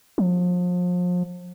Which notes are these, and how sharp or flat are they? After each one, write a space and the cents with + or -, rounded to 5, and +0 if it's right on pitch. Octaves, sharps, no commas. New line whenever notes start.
F3 +35